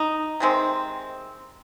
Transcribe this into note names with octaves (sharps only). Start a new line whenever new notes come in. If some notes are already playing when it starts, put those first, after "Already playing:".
Already playing: D#4
C3 D#3 G#3 C4